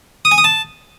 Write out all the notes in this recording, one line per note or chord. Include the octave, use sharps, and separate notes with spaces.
D#6
G#5
D#6
A5